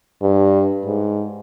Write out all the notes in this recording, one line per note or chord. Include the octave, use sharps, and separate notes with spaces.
G2
G#2